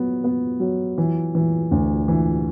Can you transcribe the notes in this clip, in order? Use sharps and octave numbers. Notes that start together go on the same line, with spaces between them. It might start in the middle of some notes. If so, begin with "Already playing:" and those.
Already playing: F#3 B3
B3
F#3
E3
E3
D2
E3